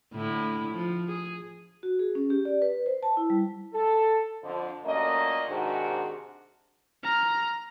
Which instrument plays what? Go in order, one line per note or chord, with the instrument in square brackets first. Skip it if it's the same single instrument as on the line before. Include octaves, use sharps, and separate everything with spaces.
[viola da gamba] A2 D3 E4
F3
G#4
[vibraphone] F#4
G#4
C#4
G4
D5
B4
C5
A5
E4
G3
[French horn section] A4
F2 D3 F3
F#2 A#2 A3 A#3 D#5
G#2 C3 D#3 D4 F#4 G#4
[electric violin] A#5 F6